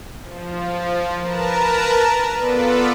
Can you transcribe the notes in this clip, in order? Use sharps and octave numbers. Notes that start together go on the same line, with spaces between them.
F3
A#4 B4 A5 A#5
B3 F4 A4 B4 D5